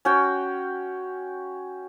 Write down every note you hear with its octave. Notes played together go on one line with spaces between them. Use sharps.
C#4 F#4 G5